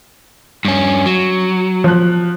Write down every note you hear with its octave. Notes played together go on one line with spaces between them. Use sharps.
G2 C#4
F#3
F3 F#6